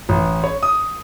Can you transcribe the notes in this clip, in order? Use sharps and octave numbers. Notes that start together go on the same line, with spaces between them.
A1
C#5
D#6